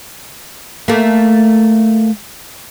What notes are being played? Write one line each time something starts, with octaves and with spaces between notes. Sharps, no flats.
A3 A#3